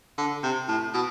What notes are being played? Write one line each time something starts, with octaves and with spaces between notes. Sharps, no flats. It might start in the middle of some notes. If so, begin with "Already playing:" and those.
D3
C3
A2
B2